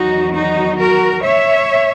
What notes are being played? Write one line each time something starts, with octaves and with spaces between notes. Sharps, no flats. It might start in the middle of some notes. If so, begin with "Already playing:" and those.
Already playing: E2 D#3 F#3 D#4 F#4
D#4 F#4
F#4 A#4
C#5 E5